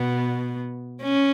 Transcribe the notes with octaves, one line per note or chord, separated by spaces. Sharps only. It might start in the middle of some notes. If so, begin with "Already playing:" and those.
Already playing: B2 B3
C#4